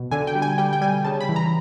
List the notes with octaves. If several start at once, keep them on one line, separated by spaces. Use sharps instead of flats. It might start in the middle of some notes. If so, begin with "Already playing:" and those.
Already playing: B2
D3 G#5
G5
G3
G#5
G3 G5
G5
G3 G#5
C#3 A5
B5
E3
A#5